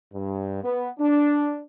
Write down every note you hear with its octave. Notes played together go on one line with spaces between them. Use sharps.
G2
B3
D4